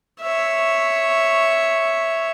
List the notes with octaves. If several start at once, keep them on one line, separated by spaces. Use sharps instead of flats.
C#5 E5